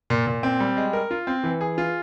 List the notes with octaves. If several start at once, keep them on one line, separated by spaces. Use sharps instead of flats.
A#2
A#2
C4
G3
G#3
A#4
F4
C4
E3
G#4
F4